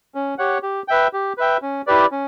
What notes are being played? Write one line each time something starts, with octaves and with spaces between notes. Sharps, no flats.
C#4
G4 C#5 F#5
G4
B4 E5 G5
G4
B4 E5 G5
C#4
E4 G4 B4 D5
C#4